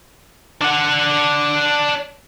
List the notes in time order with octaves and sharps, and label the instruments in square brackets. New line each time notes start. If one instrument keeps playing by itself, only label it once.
[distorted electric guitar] D4 F#5